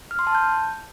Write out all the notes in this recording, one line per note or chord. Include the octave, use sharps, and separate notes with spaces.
F6
C6
A5
G6